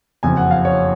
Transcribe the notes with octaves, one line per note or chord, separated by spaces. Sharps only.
F#1 F2 F3 G#5
F#5
F5
C#5